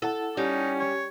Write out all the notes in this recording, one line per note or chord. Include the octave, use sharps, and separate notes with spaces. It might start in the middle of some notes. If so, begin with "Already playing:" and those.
E4 A4 F#5 A5
G3 C#4 D#4
C#5